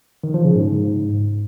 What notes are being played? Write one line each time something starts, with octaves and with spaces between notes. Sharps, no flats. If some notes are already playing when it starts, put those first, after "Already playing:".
D#3
F3
C#3
G#2